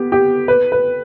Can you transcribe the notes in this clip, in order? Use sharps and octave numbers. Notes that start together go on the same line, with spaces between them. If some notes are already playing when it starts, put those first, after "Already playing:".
Already playing: B3 G4
G4
B4
B4